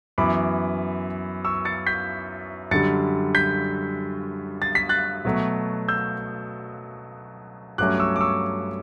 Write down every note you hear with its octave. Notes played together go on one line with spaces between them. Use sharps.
F#2 E3 B3 B5 D6
C#6 E6
A6 C#7
G6 B6
F#2 D3 G3 A6 C#7
G6 B6
A6
B6
F#6 A6
B2 F#3 A3
E6 G6
G2 F#3 A3 C#4 D6 F#6
D6
C#6 E6
D6
C#6 E6